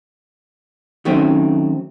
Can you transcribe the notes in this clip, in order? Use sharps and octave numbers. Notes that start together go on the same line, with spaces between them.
D#3 F#3 A3 C4 C#4 D#4